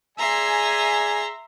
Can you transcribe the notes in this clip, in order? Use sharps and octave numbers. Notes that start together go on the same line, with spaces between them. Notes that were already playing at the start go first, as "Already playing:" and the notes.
G#4 D5 E5 G#5 A#5 C6